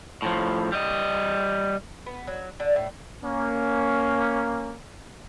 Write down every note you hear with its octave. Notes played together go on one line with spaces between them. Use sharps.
A2 F3
G3 D#5
B3
F#3
D3
A2
A#3 C#4